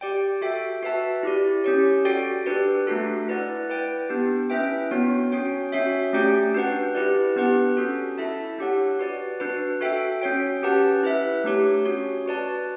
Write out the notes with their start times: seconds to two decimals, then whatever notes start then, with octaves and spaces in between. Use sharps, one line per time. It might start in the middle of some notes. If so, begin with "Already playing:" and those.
0.01 G4 D5 G5
0.41 F#4 A4 E5 G5
0.83 F#4 B4 E5 A5
1.23 E4 G4 D5
1.64 C#4 G4 C#5
2.05 F#4 A4 D5 G5
2.46 D4 G4 B4 D5
2.87 A3 D4 F#4 A4
3.28 E4 B4 D5 F#5
3.68 E4 B4 D5 G5
4.09 B3 D4 G4
4.50 C#4 E4 B4 E5 G5
4.91 B3 D4 F#4 C#5
5.32 C#4 F#4 C#5 G5
5.72 C#4 F#4 C#5 E5
6.13 A3 C#4 G4 D5 G5
6.54 D4 F#4 B4 F#5
6.95 E4 G4 B4 D5
7.36 B3 D4 G4 B4 F#5
7.77 C#4 F#4 A4
8.18 E4 A4 E5 A5
8.58 D4 G4 C#5 F#5
8.99 F#4 B4 D5
9.40 D4 F#4 B4
9.81 F#4 A4 E5 G5
10.22 C#4 F#4 C#5 G5
10.62 C#4 G4 B4 F#5 A5
11.03 E4 B4 E5
11.44 A3 D4 G4 C#5
11.85 C#4 F#4 C#5
12.26 F#4 B4 D5 A5